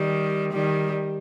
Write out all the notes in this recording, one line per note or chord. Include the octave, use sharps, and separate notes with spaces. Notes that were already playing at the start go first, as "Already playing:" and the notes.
Already playing: D#3 G3
D#3 G3